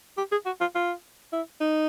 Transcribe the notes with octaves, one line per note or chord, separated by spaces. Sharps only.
G4
G#4
F#4
F4
F4
E4
D#4